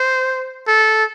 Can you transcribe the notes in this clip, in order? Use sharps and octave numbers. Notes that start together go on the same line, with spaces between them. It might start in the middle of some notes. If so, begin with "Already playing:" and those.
Already playing: C5
A4